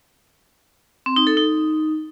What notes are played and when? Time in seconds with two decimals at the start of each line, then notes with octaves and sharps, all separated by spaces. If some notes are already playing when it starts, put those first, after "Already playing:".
1.06 C4
1.16 D#4
1.27 A4
1.37 D#4